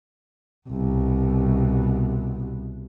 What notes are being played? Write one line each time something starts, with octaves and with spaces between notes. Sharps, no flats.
C2 B2